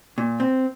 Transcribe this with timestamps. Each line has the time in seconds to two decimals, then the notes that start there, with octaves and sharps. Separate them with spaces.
0.18 A#2
0.40 C4